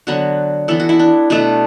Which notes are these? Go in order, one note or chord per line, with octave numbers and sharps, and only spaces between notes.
D3 F#3 B3 F#4
E3 B3 A4
F#4
E4
D4
B2 A3 D4